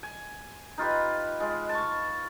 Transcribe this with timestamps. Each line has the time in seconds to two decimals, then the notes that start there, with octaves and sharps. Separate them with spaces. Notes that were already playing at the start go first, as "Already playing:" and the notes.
0.03 G#5
0.78 D#4 F4 G4 B4
1.40 G#3 F4
1.69 A5 C#6